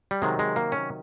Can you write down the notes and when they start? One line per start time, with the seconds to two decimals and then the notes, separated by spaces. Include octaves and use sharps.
0.11 G3
0.22 C3 D#3 F#3 G#3
0.39 G#3
0.56 A#3
0.72 C#4